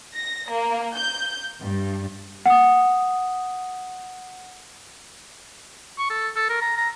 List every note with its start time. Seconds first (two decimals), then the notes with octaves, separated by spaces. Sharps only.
0.16 A#6
0.51 A#3
0.96 G6
1.63 G2
2.46 F#5 D#6
5.98 C#6
6.10 A4
6.36 A4
6.49 A#4
6.61 A#5
6.77 A#5